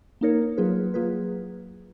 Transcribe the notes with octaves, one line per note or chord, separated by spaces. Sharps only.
A#3 D#4 A#4 C#5
F#3 A#3 F4 G#4 B4
F#3 A#3 F4 G#4 B4